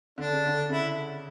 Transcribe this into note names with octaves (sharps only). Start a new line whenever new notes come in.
D3 D4
C#3
D3
C#3 E4